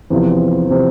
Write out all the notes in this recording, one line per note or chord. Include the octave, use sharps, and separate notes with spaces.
E2 C3 F3
C3 F3